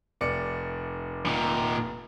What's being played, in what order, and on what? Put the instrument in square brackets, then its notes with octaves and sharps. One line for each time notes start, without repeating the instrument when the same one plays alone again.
[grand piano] F1 D5 C#7
[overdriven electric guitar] A#2 D#3